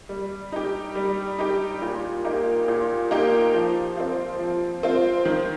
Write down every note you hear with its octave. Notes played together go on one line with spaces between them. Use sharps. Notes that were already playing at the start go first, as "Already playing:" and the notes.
G3
D#4 G4
G3
D#4 G4
A#2
A#3 D#4 G4
A#2
A#3 D#4 G4
F3
C4 F4
F3
C4 F4
D#3